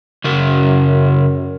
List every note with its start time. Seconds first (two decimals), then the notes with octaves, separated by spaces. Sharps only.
0.24 F#2 C#3 A#4